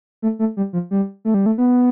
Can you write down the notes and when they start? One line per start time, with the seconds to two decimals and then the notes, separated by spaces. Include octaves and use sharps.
0.22 A3
0.39 A3
0.57 G3
0.73 F3
0.91 G3
1.25 A3
1.34 G3
1.46 A3
1.58 B3